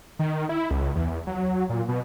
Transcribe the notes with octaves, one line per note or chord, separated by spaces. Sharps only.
D#3
E4
C#2
E2
F#3
A#2
B2